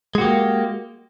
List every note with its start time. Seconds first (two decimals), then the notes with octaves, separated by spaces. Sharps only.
0.15 G#3
0.18 F#4
0.21 G4
0.24 A#3